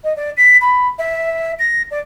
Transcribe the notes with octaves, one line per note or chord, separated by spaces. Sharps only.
D#5
D5
B6
B5
E5
A#6
D5